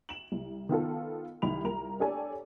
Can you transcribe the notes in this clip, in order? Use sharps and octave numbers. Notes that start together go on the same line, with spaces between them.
E7 F#7
C2
D#3 B3 F4 A4
C2 D#3 B5 F7
C2 F4 A#4 A#5 F7
D4 G4 A4 C#5 D5 G#5